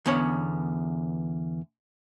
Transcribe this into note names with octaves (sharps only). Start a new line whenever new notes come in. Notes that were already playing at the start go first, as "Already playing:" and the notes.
E2 D3 B3 C#4 C#5